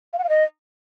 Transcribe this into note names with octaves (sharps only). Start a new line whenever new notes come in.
F5
F#5
F5
D#5